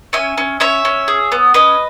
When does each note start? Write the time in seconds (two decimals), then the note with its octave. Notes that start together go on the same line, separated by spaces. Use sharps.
0.13 C#4 E5 G#5
0.38 C#4
0.60 C#4 C#5 E5
0.85 C#4
1.08 G#4
1.32 B3
1.54 C#4 B4 D#5